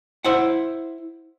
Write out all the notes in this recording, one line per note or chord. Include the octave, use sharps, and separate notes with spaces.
E4 C5 F#5